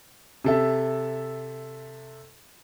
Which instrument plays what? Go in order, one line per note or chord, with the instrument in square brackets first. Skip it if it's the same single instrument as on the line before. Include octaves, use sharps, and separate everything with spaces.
[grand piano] C3 A4 E5